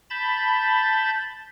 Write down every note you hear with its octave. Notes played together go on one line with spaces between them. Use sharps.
A5 B5 G6 A6